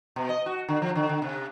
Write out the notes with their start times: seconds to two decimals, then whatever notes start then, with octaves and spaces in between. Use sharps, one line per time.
0.16 B2
0.29 D#5
0.46 F#4
0.68 D3
0.82 F3
0.95 D3
1.09 D3
1.22 C3